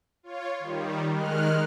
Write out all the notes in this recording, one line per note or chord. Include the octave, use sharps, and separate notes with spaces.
F4 C#5
D#3 G3
D#3 G#3 F6 F#6